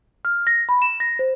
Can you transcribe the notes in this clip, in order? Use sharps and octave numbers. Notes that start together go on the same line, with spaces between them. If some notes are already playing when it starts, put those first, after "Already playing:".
F6
A#6
B5
E7
A#6
C5